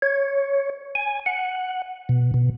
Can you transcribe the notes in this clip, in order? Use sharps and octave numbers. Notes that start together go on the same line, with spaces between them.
C#5
G#5
F#5
B2
B2